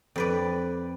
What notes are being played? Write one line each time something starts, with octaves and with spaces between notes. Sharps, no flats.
F2 B4 D5